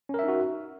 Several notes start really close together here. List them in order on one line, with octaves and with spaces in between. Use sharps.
C#4 A#4 E5 D#4 F#4